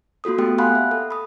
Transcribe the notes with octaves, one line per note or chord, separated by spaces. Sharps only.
A#3 F4 F#4 A4 D#6
A3 B3 G4 A4 G5
F5 F#5 G#5 B5 C6 F#6
E5
A4
B5 D#6